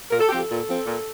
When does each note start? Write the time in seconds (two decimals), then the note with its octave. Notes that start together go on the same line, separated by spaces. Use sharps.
0.10 A#2 A#4
0.20 A4
0.29 F3 C4 G4
0.39 A4
0.49 A#2
0.67 F3 C4
0.85 A#2